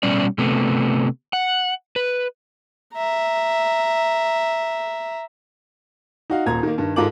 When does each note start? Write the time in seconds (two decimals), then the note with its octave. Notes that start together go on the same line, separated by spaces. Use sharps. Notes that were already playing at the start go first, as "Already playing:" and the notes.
0.03 B2 G3 C#4 D5
0.38 C3 A3 B3
1.33 F#5
1.96 B4
2.95 E5 A#5
6.30 D#4 F#4 F5
6.46 D#1 A#2 A#5 G#6
6.63 D#3 A#3
6.78 G2 D#3
6.96 G#2 F4 A4 A#4 D6 F#7